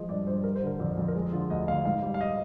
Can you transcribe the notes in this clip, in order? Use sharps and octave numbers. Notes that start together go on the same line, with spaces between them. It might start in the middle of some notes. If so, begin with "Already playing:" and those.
Already playing: F3 G3 G#3 D#5
G2 D5
G2 C5
G3 A#4
C5
D3
A#4
F2 D5
F2
A#4
G#3 G#4
D3 F4
D2 D#5
D2 F5
G#2 F5
G3
F5
D#5